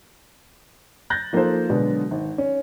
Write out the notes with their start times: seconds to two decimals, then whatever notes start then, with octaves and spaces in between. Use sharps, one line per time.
1.10 F#6 G6 A6 A#6
1.33 F3 A#3 D#4 A4 C5
1.69 B2 D3 F#3 G#3
2.11 G#1
2.38 C#4